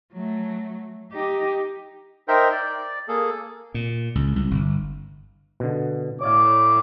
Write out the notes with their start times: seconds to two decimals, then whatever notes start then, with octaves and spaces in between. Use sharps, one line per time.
0.13 F#3 A3
1.12 D#4 G4
2.28 D#4 A#4 C5 E5 G5
2.52 D5
3.08 A#3 G#4 A4
3.74 A#2
4.15 C#2
4.36 C2
4.51 G1
5.60 B2 D3
6.21 A2 C#5 D5 F5 D6